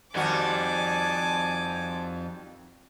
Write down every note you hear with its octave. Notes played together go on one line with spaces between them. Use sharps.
F2 D#3 G3 F#4 G#5 A5 D6